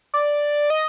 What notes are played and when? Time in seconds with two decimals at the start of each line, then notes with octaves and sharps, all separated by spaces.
0.14 D5
0.70 D#5